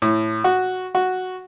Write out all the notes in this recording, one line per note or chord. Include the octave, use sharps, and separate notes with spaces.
A2
F#4
F#4